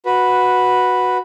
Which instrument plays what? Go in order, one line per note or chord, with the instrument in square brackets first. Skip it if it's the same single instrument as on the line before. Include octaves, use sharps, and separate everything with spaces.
[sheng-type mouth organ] F#4 B4